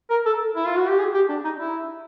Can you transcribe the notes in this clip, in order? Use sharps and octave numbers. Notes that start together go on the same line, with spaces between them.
A#4
A4
E4
F4
F#4
G4
G#4
G4
D4
D#4
E4